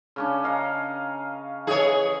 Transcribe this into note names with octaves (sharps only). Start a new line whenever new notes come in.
C#3 C#4 D4
D#5 F5 A#5
E3 G#4 C#5 D#5